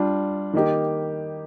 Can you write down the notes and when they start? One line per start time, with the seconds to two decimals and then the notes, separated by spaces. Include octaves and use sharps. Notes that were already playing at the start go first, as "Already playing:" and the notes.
Already playing: G3 D4 F4
0.53 D#3 A#3 D#4 G4